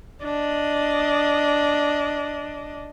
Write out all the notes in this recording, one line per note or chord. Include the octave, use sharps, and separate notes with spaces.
D4 D#5